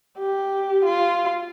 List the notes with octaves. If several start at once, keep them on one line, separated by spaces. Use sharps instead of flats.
G4
F4